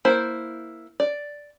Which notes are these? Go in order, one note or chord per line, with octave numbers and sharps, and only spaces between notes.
A#3 E4 C5
D5